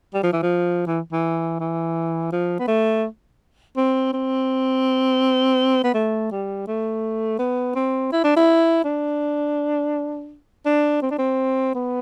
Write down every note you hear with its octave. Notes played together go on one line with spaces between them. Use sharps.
G3
F3
E3
F3
E3
E3
E3
F3
B3
A3
C4
C4
B3
A3
G3
A3
B3
C4
E4
D4
E4
D4
D4
C4
D4
C4
B3